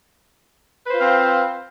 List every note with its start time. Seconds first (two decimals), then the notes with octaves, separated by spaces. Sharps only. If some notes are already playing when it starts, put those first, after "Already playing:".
0.86 B4
0.90 C5
0.93 F4
0.96 F5
0.99 C4